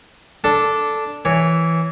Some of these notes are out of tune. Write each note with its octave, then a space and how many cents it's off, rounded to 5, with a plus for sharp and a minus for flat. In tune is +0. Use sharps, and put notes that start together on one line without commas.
D4 -5 A4 +0
E3 +0 C#5 +0